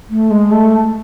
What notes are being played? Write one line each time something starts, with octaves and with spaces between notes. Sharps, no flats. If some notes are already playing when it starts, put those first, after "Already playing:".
A3
G#3
A3